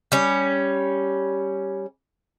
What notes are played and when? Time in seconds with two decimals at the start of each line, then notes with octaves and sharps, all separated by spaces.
0.12 G3 C#4